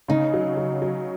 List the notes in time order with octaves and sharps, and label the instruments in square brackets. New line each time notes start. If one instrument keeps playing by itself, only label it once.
[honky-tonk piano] C#3 [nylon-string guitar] D#4
[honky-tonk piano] F#3
F#3
F#3